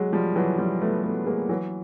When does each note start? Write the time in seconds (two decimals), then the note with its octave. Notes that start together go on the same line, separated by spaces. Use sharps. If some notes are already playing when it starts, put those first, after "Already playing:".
Already playing: F#3 G#3
0.13 F3 G3
0.36 E3 F#3
0.58 F3 G3
0.81 A3 B3
1.04 A3 B3
1.26 G#3 A#3
1.49 E3 F#3